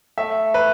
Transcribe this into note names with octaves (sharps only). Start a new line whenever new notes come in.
A3 E5
B4